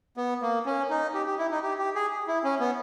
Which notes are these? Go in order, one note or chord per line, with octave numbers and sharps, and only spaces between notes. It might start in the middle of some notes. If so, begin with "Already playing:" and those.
B3
A#3
C#4
D#4
G4
G4
E4
D#4
G4
G4
G#4
E4
C#4
B3